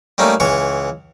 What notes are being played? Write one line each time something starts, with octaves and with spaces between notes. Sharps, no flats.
G3 A3 A#3 C#4 D#4
C#2 E3 C#5 C#6